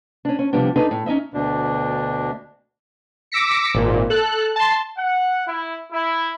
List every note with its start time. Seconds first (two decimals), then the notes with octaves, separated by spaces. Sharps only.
0.25 C#4 D4
0.39 C#4
0.53 C3 F3 G3 B3 D4
0.76 D4 D#4 G#4 A4 B4
0.91 A2
1.06 C#4 D#4 D#5 E5
1.34 D2 B2 D4
3.32 D6 E6 A#6 B6 C#7
3.75 G#1 A#2
4.10 A4 F#6
4.56 A5 C6
4.97 F#5
5.46 E4
5.92 E4